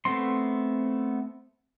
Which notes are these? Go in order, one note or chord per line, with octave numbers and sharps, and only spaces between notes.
A3 B3 C4 C6